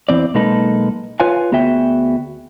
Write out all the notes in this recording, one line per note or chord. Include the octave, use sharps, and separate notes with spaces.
E2 E3 C4 D5
B1 G#3 A#3 D#4 A4 B4
F4 B4 C#5 F5 G#5
D2 B3 F#4 G#4 E5 G5